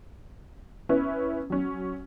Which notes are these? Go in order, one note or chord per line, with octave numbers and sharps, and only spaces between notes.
B3 C#4 E4 B4
F#3 C#4